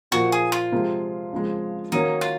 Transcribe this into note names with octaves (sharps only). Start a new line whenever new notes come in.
A#2 F3 A#3 F#4
G#4
F4
C3 F3 G#3
F2 C#3 F3 G#3
D#3 F#3 A#3 C#4 D#4
F4